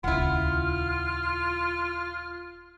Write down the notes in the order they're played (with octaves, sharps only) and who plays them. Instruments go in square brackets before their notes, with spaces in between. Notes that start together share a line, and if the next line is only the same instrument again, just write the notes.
[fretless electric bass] D#1 C#2 [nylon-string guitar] E4 F#5 [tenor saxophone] F4 [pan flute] F6